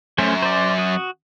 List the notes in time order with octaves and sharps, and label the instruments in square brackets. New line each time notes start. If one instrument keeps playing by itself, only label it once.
[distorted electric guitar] F#2 [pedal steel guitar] A3 C#4 C5
[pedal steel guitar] C5 D5
F#4 D#6